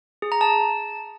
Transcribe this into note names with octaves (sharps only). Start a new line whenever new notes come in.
G#4
A#5
A5